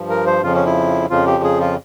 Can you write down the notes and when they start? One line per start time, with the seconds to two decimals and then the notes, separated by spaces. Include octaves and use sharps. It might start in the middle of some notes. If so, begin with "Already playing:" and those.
Already playing: G2 F3
0.10 A#4
0.27 C5
0.43 F2 C#3 F3 F4
0.54 C#4
0.66 E4
1.10 F2 C#3 F3 F4
1.27 G4
1.44 G#4
1.60 F4